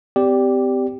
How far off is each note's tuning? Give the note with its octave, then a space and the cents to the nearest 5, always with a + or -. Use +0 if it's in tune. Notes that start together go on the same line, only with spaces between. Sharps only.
C4 -40 G4 +0 D5 -15